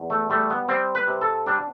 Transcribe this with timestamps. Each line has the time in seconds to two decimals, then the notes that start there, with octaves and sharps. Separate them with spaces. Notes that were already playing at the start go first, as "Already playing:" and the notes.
Already playing: E2
0.10 A3
0.30 G3 A3
0.50 B3
0.69 G3 C4
0.95 B4
1.07 C3
1.21 A4
1.46 G3 D4